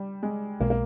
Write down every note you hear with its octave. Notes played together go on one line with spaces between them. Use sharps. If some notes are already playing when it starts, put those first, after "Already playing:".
Already playing: G3
G#3
B1 B2 G#3 A#3
A#3